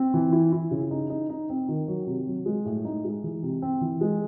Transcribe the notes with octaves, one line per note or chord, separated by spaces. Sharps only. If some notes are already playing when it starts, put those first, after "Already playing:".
Already playing: C4
E3
E4
E4
C#3
D#4
D#4
D#4
C4
D#3
F#3
C3
F#3
G#3
A2
D#4
G#3
E3
C3
C4
E3
G#3